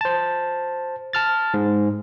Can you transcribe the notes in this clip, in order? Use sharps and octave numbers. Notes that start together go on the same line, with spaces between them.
C5 A5
A5 F6 A6
G#2